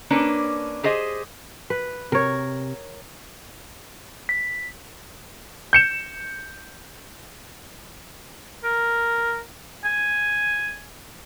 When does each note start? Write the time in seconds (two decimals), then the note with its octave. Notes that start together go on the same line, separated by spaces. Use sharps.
0.10 A#3 C#4 D4 B4
0.83 G4 G#4 C5 D#5
1.70 B4
2.12 C3 A#4 C#5
4.29 B6
5.73 G6 C#7 E7
8.64 A#4
9.85 G#5